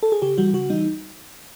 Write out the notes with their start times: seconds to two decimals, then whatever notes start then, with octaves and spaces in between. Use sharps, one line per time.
0.03 A4
0.12 G#4
0.22 C#3 G4
0.38 E3 G3 F#4
0.53 C#3 F#4
0.70 E3 G3 D#4